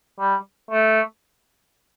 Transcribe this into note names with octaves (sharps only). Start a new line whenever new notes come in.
G3
A3